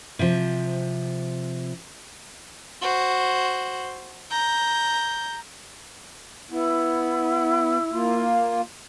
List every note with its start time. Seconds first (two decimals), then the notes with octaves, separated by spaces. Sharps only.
0.19 C3 F3
2.81 F#4 C5
4.31 A#5 G6
6.50 B3 E4
7.92 A#3 F4